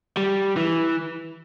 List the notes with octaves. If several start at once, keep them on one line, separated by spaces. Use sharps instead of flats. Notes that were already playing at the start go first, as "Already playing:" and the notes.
G3
E3